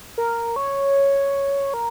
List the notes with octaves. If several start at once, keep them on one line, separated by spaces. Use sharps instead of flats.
A#4
C#5
A#4